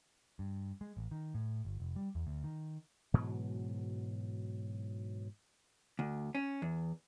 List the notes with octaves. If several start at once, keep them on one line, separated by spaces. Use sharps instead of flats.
G2
G#3
A1
D#3
A2
G1
F1
G3
E2
D2
D#3
G#2 B2 E3 F#3
D2
C#4
E2